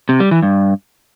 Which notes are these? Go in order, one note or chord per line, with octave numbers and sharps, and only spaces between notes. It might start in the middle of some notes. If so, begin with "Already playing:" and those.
C3
G3
E3
G2